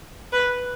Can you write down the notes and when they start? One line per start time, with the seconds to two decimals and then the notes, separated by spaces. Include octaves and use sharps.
0.33 B4